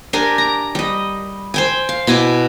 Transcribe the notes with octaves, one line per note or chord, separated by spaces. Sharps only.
D4 G4 A#4 G#5
A#5
G3 D#5
C5 G5 G#5
F5
B2 E4 G#5 D6